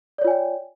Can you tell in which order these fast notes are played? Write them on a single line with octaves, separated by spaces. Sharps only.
D5 C#5 F4 G#5 G5